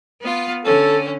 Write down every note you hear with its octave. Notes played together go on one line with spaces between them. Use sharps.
B3 F4
D3 C#4 A4